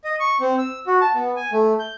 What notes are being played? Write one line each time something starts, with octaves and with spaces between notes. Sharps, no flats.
D#5
C#6
C4
E6
F#4
A5
B3
G#5
A3
G6